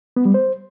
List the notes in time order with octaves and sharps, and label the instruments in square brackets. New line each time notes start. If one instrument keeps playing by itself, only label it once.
[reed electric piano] B3
G3
C5